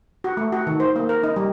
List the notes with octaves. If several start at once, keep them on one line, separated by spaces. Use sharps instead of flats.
F#4
A3
F#4
D#3
C5
A#3
A#4
D#4
G3